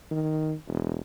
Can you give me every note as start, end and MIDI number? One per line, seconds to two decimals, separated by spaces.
0.11 0.54 51
0.68 1.01 28